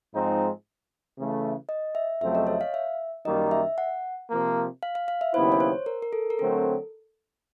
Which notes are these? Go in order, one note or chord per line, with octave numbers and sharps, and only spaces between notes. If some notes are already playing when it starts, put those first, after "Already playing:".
G#2 F3 G#3 C4 D#4
C#3 E3 A3
D#5
E5
F2 C#3 F#3 A3 C4 E5
D#5
C#5
F5
E5
F#2 D#3 G3 A#3 D#4 D#5
E5
F#5
C3 F3 A#3
F5
F5
F5
E5
D#2 C#3 F#3 B3 E4 C5
C#5
C5
A#4
A#4
A4
A#4
D3 F#3 A3 C4 A4